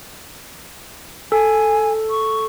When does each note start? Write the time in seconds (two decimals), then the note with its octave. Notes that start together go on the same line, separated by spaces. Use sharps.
1.32 A4 G#5
2.10 C#6